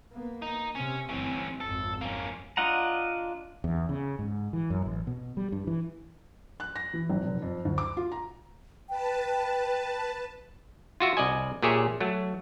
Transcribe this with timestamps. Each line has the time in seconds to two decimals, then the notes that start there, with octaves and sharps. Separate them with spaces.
0.12 A#3 B3
0.42 D#4
0.75 C3 C4 C#4
1.10 G1 E3 C4 C#4
1.60 G#1 F2 A4
2.01 A#3 C#4
2.57 D4 F4 D#5 F#5 A#5
3.64 E2
3.89 C#3
4.19 G#2
4.53 E3
4.70 F#2
4.86 A1
5.07 B2
5.37 G3
5.52 G2
5.67 E3
6.60 F#6
6.76 A#6
6.93 E3
7.10 G#1
7.26 F1
7.42 F2
7.65 D2
7.78 D6
7.97 F4
8.12 A#5
8.89 B4 G5 A5
11.00 F4 F#4 E5
11.17 C2 D5 D#5 G#5
11.63 A#2 G4 G#4 C#5 E5
12.00 F#3 A3